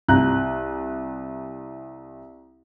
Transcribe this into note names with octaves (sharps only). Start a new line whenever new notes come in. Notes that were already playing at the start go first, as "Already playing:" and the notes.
C2 A#5 F#6